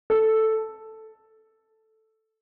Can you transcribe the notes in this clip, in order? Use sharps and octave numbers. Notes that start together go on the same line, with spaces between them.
A4